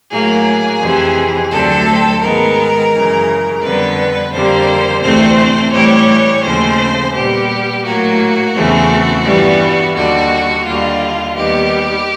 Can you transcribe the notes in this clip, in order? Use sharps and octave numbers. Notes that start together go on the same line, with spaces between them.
A2 F#3 A#3 G#4
F2 C3 E3
D2 D3 F#3 A3 C4 A4
G#2 D#3 G#3 B3 A#4
F#2 C#3 E3
F2 D3 G3 B3 B4
F2 D3 G3 A#3 C5
D2 C3 E3 A3 C4 C5
A2 E3 G3 C#5
D#2 C#3 F3 A3 C4 C5
A#2 G3 B3 G4
A2 F#3 A#3 F#4
E2 C#3 E3 A3 C4
G2 E3 G3 B3
D#2 D3 G3 F#4
D#2 D3 G3 F4
D#2 D#3 G3 B3 G4